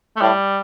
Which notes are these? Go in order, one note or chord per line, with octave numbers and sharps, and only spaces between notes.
A3
A2 G3